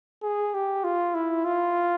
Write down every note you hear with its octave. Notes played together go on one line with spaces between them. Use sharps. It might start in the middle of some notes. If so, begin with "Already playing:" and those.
G#4
G4
F4
E4
F4